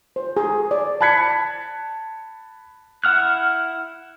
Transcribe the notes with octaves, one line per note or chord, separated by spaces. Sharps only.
C5
G#4
D5
A5 B5 F#6 G#6 B6 C#7
E4 F#5 F6 F#6